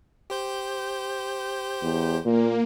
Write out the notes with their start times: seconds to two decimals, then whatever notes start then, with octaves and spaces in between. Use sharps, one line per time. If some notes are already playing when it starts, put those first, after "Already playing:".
0.30 G4 C5 G6
1.82 E2
2.25 A#2 A#3